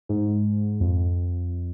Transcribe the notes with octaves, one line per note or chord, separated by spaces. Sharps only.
G#2
F2